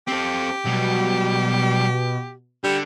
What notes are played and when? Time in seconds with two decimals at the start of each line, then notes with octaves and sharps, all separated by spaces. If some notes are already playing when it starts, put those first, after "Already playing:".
0.08 C4 G4 A4
0.66 B2 F#3 G3
2.64 D3 G3